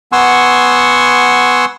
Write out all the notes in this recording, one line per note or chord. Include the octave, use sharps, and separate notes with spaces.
B3 F#5 G#5 C6 C#6 E6